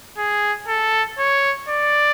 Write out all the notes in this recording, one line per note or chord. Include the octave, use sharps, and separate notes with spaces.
G#4
A4
C#5
D5